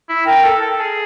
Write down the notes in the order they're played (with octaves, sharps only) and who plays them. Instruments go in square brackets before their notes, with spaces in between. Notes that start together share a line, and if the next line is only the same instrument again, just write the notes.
[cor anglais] E4
[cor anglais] A#4 [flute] G5
[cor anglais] A4
A4
G#4